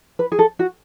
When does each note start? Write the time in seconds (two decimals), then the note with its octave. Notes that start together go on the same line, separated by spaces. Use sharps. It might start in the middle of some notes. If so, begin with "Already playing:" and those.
0.19 B4
0.32 G#4
0.39 A4
0.59 F#4